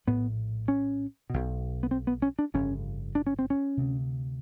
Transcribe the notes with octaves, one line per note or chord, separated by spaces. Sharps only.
A#1 A2 B3
C#4
B1 B2
B3
C4
B3
C#4
D4
G1 F2 C#3 C#4
D4
C#4
C4
C#4
D2 C3